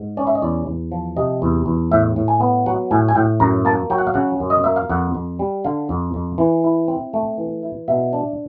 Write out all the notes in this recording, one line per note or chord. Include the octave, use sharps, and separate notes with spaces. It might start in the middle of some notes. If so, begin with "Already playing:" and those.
Already playing: G#2
C#4 D5
E5
D#5
E2 D5
E2
F3
C3 D#5
E2
E2
A2 E5
A2
G#5
B3
F#3 F#5
A2 G#5
G#5
A2 G5
F#2 A#5
A#3 A5
F#3 G5
F#5
F5
C#3 F#5
F#2
D#5
A#3 E5
F5
F2 F#5
F2
G3
D3 F5
F2
F2
E3
E4
C4
A3
E3
E4
B2 E5
D4